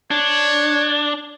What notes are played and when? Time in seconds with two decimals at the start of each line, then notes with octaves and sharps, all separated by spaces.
0.11 D4 C#5